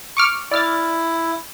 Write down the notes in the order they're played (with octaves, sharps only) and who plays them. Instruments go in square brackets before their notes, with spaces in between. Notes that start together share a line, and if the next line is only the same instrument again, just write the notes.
[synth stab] C#6 D6 F6
[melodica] E4 [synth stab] D5 F6 A6